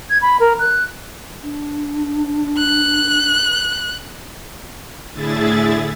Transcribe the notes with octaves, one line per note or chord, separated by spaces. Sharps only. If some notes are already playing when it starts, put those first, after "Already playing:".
G#6
B5
A#4
F#6
D4
F#6
A2 D3 E4 G#4 E5 A6